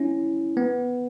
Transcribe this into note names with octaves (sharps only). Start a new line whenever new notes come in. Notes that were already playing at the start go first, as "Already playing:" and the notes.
Already playing: C#4 E4
B3